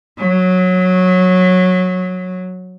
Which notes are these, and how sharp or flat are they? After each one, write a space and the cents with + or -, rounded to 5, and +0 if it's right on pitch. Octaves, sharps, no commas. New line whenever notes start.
F#3 -15